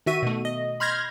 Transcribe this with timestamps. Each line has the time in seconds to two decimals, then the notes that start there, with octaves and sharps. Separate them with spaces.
0.06 D#3 F#4 E5 D#7
0.23 B2 A3
0.45 D#5
0.80 B5 C6 F6 G6 G#6 A#6